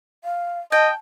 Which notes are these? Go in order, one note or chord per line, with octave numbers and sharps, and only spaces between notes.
F5
D#5 G5 A5